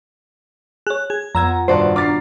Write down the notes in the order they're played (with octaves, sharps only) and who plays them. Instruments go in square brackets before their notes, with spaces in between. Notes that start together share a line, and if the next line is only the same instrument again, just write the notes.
[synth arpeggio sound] G#4 C#5 [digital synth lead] F#6
[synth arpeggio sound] G#4 [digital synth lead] G#6
[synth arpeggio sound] F2 E6 G#6 [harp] B3 F4 [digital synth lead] A#5
[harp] D#1 F#4 [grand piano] G2 D5 A5 [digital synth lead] C5
[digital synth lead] D4 [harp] A#5 F6 B6 [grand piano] D6 A6 C7